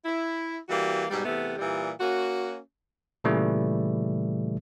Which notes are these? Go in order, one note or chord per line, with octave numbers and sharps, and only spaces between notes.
E4
E3 G3 A#3 F#4
G#2 B2 G3
E2 C3 A3 B3
A#2 E3 G3
A#3 C#4 F#4
A#2 C#3 E3 G3 A3